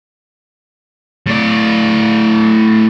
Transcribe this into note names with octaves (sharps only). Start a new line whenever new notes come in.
A2 D5